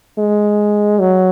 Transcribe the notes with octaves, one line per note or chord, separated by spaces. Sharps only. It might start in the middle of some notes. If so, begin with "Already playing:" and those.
G#3
F#3